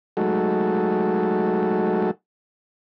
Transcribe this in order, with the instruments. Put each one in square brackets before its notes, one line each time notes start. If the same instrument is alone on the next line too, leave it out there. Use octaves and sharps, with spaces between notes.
[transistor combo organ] F#3 G#3 A3 D#4 F#4 A4